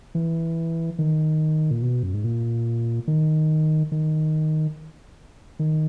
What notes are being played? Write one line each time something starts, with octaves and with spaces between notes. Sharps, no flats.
E3
D#3
A#2
B2
F#2
G#2
A#2
D#3
D#3
D#3